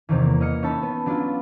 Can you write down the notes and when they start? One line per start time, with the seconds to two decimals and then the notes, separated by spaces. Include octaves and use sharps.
0.09 E2 C3 D#3 E3
0.22 A#3
0.40 E3 D#5 F6 C#7
0.62 C#4 D#4 E5 A5 B5
0.83 B3
1.06 F#3 D4 E4 F4